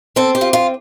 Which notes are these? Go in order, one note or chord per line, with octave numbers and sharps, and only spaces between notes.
C4 A4
G4
F4
F4